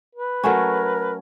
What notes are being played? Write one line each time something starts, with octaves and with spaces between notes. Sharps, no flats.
B4
F#3 A3 C#4 A#4